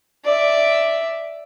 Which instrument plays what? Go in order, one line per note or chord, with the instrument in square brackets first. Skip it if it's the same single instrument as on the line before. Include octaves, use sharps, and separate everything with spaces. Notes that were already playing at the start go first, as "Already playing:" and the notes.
[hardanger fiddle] D5 E5